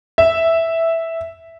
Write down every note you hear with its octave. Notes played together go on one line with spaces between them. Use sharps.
E5